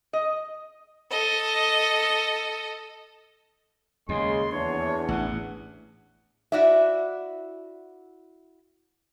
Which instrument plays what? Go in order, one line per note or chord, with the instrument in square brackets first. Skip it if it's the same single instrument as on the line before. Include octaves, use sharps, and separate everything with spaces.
[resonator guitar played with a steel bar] D#5
[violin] A4 D#5
[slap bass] D#2 [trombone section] C#3 G#3 [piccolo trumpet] C6
[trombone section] E2 [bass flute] D4 [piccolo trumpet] C#5
[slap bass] A1 A2 [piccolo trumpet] F#5
[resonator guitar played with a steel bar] E4 F#4 D5 E5